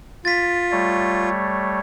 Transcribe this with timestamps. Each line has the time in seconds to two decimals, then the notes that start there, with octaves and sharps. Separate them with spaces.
0.25 F4 A6 B6
0.72 G3 A3 C#5